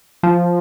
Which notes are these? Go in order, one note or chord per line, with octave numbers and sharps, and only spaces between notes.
F3